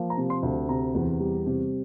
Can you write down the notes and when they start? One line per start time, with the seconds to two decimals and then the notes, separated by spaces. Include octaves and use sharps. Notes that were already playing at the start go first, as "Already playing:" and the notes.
Already playing: F3 A#3
0.10 A#5
0.17 C3
0.30 C6
0.43 D2
0.68 C3 A#5
0.95 E2
1.20 G3
1.46 C3